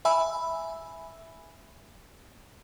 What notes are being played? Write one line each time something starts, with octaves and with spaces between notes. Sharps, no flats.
E5 G#5 B5 E6